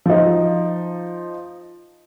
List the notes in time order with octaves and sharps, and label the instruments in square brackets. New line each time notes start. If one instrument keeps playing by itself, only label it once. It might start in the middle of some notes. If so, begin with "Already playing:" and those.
[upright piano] F3 D#4